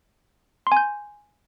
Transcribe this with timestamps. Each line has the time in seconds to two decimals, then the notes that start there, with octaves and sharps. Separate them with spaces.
0.67 C6
0.72 G#5
0.77 G6